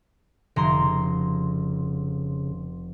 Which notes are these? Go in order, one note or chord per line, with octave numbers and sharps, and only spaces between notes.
F1 D3 A#5 C6
C#3